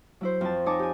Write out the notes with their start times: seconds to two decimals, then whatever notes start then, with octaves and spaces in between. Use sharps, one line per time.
0.21 F#3 E4 C5
0.41 F2 F3 A5
0.66 D#4 C#5 D#5 G#5 A5 D6
0.79 G4 G#5